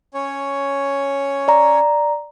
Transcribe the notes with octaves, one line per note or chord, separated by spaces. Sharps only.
C#4 C#5
D5 A#5